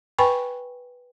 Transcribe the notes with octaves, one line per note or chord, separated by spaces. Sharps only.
B4 G5 G#5 B5 C#6